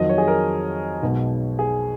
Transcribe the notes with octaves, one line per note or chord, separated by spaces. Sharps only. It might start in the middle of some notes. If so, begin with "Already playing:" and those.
Already playing: F2 D#3 F#3 D#5
C#5
G#4
A#4
B1 B2 G#3
G#4